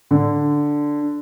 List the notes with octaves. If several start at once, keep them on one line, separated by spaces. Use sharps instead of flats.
D3